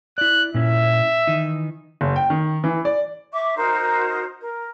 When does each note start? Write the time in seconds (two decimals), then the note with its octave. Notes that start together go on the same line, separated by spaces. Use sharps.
0.18 E4 D5 F#6
0.54 A#2 C#4 E4 E5
1.27 D#3 E3 D#4
2.01 F#1
2.16 G5
2.30 D#3
2.64 E3
2.85 D5
3.32 E5 C#6 D6
3.56 D#4 F#4 A#4 C5
4.40 A#4